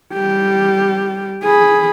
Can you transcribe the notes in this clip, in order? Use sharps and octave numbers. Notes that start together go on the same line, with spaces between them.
G3 G4
G#4 B5